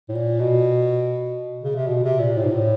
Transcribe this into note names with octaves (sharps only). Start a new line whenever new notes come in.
A2
A#2
B2
C#3
C3
B2
C3
A#2
A2
G#2
A2